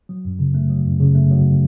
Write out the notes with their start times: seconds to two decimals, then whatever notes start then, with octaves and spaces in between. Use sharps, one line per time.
0.09 F#3
0.25 F#2
0.39 C#3
0.54 A3
0.70 F#3
0.85 F#2
1.00 C#3
1.15 A3
1.31 F#3